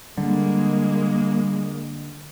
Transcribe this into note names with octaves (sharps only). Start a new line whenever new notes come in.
D3 G3 G#3 A#3